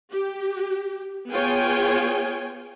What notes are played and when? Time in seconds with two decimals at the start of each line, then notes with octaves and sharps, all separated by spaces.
0.11 G4
1.31 B3 F4 G#4 C#5 G5 G#5